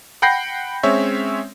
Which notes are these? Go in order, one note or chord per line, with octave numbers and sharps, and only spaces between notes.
F#5 G5 B5 G6 A#6 C7
G#3 C4 C#4 C#5 E5